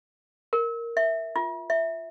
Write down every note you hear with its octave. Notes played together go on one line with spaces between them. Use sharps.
A#4
E5
F4
E5